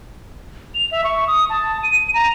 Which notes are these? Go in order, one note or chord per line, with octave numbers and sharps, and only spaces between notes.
F7
E5
C#6
D#6
A5
D#7
A#5